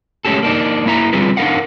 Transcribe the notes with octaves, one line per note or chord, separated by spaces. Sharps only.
G#3 A3 C#4 F#4 G4 A4
A#3 D4 D#4
A#3 E4 E5 A#5
D3 G3 C4 F4 G#4 B4
D4 D#4 A#4 F5 F#5